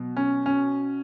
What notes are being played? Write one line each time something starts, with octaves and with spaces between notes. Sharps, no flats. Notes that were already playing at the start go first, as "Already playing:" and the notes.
Already playing: B2 F#3
C#4
C#4